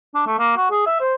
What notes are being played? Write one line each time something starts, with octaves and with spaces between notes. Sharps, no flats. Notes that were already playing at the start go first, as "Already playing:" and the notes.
D4
A3
A#3
F#4
G#4
E5
C5